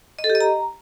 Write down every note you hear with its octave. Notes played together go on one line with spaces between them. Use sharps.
D#5
A4
G4
D#5
A#5